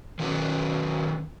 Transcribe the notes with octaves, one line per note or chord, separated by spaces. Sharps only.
D#3 F#3 C#4 B4